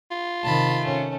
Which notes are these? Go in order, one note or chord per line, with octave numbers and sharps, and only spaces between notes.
F4
C3 D#3 A5 B5
A3 C#4